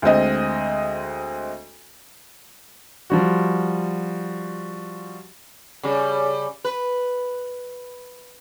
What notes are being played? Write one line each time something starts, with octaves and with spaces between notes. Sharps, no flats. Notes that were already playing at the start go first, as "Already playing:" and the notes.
D2 G#3 C4 D#5
F3 G3 F#4
C#3 G3
B4